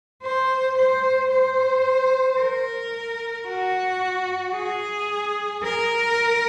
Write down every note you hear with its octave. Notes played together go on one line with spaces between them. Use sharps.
C5
C5
C5
A#4
F#4
G#4
A#4